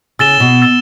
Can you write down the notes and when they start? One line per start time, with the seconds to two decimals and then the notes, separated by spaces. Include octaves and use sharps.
0.19 C#3 E6 A6 E7 G7
0.40 B2
0.62 E6 A6 E7 G7